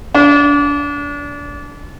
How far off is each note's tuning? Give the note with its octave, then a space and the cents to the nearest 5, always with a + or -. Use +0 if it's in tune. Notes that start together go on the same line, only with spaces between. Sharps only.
D4 -30